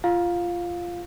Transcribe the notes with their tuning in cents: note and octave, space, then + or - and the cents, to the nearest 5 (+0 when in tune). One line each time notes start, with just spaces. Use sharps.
F4 -15 F5 +15